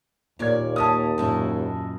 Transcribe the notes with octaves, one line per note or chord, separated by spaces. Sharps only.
D#2 A#2 A#3 C#5 D5 G#6
C#4 G4 A#4 A5 D#6
F#2 A#2 D#4 E4 F#4